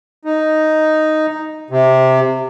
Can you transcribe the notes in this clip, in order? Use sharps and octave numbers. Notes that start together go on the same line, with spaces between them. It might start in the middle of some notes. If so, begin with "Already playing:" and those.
D#4
C3